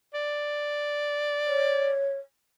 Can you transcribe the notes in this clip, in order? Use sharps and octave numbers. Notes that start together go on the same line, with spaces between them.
D5
C#5